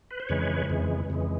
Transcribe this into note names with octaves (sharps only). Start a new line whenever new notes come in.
B4
C5
F2 C#3 E3 G#3 B4 C#5
F2 C#3 E3 G#3
F2 C#3 E3 G#3